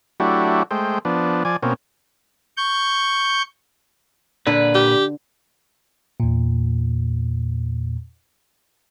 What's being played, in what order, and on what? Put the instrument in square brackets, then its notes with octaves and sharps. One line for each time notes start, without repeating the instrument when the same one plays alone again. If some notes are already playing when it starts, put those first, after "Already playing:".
[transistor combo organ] F#3 A3 D4 E4 F#4 G4
G#3 A3 C5 G5
F3 B3 D4
F3 D5 G#5
B2 A#3 C4 C#4
[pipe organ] C#6 G6
[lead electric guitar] A#2 B4 [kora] D3
[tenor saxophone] G4
[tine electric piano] E2 A#2